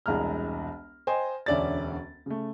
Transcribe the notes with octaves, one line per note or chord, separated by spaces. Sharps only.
E1 C2 G#3 A#5 F6
C5 D#5 G5 G#5
E1 D2 C#4 D5 E5 A6
C#3 A3